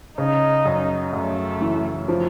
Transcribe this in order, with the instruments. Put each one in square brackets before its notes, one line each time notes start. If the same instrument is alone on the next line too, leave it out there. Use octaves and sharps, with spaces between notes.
[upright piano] C#3 [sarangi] D#4
[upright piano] F#2
[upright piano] F#2 [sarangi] A3
[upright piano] E3
F3